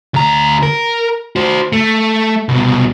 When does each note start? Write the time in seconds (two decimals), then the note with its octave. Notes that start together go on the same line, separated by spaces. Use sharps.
0.14 D2 A#5
0.63 A#4
1.36 F#4 C5
1.73 A3
2.49 C2 B2